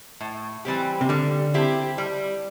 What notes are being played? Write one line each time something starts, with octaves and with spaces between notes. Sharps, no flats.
A2
E3 G3 C4 G4
C3
D3 G3
C4 E4 G4
G3